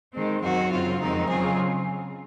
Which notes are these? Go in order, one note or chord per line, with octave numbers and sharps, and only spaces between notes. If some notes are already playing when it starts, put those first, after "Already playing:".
D#3 G#3 C4
F#2 D#3 F#3 C4 F#4
F#2 C#3 F#3 C4 F4
F2 D#3 G#3 C4 D#4
C#3 F#3 C4 F4 G#4